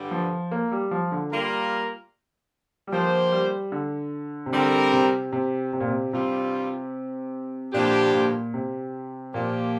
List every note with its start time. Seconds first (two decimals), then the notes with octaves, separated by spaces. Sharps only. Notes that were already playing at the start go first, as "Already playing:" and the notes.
Already playing: G2 D3 G3
0.11 F3
0.51 A#3
0.72 G3
0.91 F3
1.12 D3
1.32 G3 A#3 F4 A#4
2.87 G3
2.92 D3 F3 A#3 G4 C5
3.32 G3
3.72 D3
4.46 C3
4.53 D3 G3 C4 A#4
4.92 C3
5.32 C3
5.73 C3
5.80 A#2
5.88 C3
6.13 G2 C3 G3 C4 F4
7.73 G2 A#2 D3 F3 D4 G4
8.14 A#2
8.54 C3
9.34 A#2 F3 A#3 G4